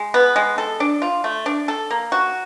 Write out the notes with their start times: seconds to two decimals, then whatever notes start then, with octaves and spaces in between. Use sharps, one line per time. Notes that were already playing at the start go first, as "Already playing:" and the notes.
Already playing: G#3
0.14 B3
0.36 G#3
0.58 A4
0.80 D4
1.02 F4
1.24 A3
1.46 D4
1.68 A4
1.91 A#3
2.12 F#4